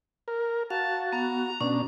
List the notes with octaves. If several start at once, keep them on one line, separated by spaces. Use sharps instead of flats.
A#4
F#4 F5 A5
B3 A#5
B2 C#4 D4